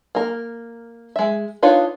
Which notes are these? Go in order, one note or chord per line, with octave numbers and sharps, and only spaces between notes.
A#3 A#4
G#3 E5
D4 D#4 F4 B4 C#5